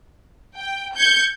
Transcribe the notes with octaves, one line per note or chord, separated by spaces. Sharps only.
G5
G6 G#6 C#7